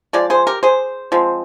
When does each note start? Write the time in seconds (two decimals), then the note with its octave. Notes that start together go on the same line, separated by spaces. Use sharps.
0.13 F3 G#3 D5
0.30 G#4 C5
0.47 G4 A#4
0.63 G#4 C5
1.12 F3 G#3 C4